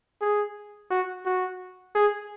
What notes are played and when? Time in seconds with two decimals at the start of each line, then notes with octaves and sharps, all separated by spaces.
0.21 G#4
0.90 F#4
1.26 F#4
1.95 G#4